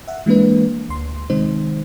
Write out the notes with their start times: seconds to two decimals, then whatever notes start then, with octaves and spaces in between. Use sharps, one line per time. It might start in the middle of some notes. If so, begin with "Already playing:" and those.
0.08 E5 F#5
0.26 E3 G#3 A#3 D4 B4
0.89 D2 C6
1.30 C3 D#3 G#3 D#4 C5